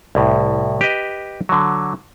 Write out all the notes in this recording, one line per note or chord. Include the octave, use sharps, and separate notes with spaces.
C2 A2
G4 B4 D#5
D3 F#3